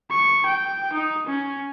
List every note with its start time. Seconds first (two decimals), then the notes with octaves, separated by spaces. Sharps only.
0.10 C#6
0.46 G5
0.93 D#4
1.26 C#4